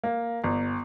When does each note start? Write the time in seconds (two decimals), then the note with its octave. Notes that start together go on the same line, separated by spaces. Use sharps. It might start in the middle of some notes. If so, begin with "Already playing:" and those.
0.04 A#3
0.44 G1